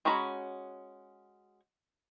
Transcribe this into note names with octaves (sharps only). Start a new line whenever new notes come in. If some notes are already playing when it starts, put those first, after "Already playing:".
G#3 C#4 F#4 A#5 B5